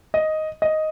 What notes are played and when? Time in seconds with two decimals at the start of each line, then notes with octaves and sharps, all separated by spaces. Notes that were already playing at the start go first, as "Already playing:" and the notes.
0.14 D#5
0.62 D#5